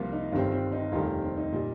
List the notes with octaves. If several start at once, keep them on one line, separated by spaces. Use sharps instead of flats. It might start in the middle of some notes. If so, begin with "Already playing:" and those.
Already playing: C2 C3 F3 A#3 F4 A#4
D#4
G1 G2 D#3 G3 C4 F4
C4
D#4
F1 D#2 D#3 G3 F4
C4
D#4
A#2 G3